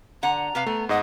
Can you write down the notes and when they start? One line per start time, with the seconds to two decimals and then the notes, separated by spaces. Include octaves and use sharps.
0.23 D3 F#5 A#5
0.55 C3 B4 F5
0.66 A3 B3
0.89 G#2 D#5 F#5